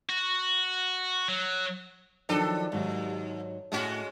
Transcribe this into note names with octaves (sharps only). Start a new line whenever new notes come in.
F#4
F#3
D#3 F3 F#3 D4 A4
D#2 G#2 F#3
A2 G#3 C#4 F#4